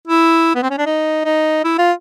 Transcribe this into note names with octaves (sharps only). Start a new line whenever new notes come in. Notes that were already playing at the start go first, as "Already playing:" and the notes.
E4
B3
C4
C#4
D4
D#4
D#4
E4
F4